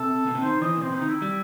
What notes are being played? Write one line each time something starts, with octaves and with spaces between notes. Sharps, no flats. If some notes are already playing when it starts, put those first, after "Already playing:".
Already playing: C3 A4
B2
C3
D#3 C5
E3 D#5
B2
C3 C5
C3 D#4
D#3
E4
G3